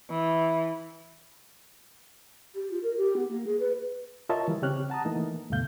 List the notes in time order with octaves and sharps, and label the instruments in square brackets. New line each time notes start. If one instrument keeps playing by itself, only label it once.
[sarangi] E3
[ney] G4
F4
A#4
G4
B3
A#3
G#4
B4
[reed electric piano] F4 A#4 C#5 D#5 E5 A5
E3 G3
C#3 C4 G4 C#5 F6 F#6
F#5 A5 A#5 D#6
E3 A3 A#3 D#4
D2 G2 B2 A3 F5 G6